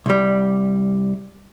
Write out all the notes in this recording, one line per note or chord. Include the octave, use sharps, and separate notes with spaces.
C2 G3